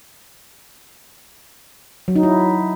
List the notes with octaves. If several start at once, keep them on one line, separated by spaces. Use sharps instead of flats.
F#3
D#4
E4